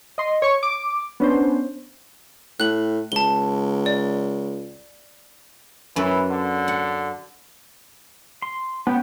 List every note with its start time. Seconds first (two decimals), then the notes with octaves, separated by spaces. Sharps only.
0.18 D#5 C6
0.42 C#5 C#6
0.63 D6
1.20 B3 C#4 D4 C5
2.60 A2 F#6 F#7
3.12 C#2 A5 G7
3.86 D5
5.96 F#2 E3 B4
6.30 D3
6.68 F#5
8.42 C6
8.87 B3 C#4 G5